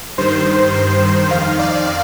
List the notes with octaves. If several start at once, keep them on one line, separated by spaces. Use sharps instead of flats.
G2 D#3 C5
C5
F2 D#3 F5
D5